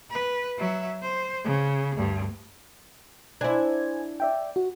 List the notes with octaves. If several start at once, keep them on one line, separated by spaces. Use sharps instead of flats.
B4
F#3 E5
C5
C#3
D2 G2
D4 E4 C5 G#5 G#6
D5 E5 G5
F#4